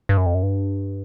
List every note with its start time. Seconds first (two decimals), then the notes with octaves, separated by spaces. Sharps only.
0.09 G2
0.17 F#2
0.26 F2
0.34 F#2
0.43 G2